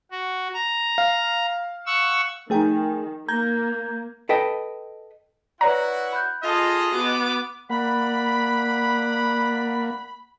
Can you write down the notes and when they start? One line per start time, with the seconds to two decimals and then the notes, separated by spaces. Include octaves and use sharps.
0.11 F#4
0.54 A#5
0.98 F5
1.86 F#5 C#6 E6
2.50 D#3 F3 A3 D#4 G#4 G5
3.28 A#3 A#5 G6 G#6
4.29 A4 B4 D#5 G5
5.61 E4 F#4 B4 C#5 D5 F#5 A#5
6.13 B5 F#6 G6
6.43 F4 G#4 A4 D#5
6.93 B3 F#4 D6
7.70 A#3 D5 F#5 B5